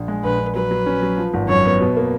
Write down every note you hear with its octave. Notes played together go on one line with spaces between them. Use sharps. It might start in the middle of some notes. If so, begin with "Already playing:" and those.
Already playing: A#1
G#3
A#1 B4
A#1
F#3 B4
F#3
C#4
F#3
F3
G#1
F#2 C#5
B3
B2
A#3